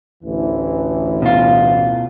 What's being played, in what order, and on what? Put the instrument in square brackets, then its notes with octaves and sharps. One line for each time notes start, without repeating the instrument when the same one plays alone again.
[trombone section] A1 D2 E3
[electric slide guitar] B2 F4